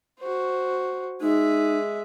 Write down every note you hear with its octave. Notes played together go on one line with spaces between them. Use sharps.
F#4 C5
G#3 D#4 E5